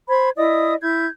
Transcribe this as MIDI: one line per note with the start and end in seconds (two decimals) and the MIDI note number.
0.08 0.29 72
0.08 0.29 83
0.08 0.29 92
0.37 0.75 64
0.37 0.75 74
0.37 0.75 75
0.37 0.75 87
0.81 1.05 64
0.81 1.05 91
0.81 1.05 92